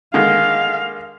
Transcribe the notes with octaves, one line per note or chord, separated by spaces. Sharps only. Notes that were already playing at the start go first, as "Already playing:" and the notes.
D3 D#3 G#3 F5